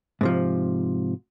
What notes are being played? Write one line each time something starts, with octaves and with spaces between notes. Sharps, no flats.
G#2 C3 F3